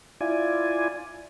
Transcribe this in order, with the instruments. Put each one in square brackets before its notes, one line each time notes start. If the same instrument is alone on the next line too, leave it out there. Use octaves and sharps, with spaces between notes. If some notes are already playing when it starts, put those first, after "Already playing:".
[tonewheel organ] E4 F4 D5 G#5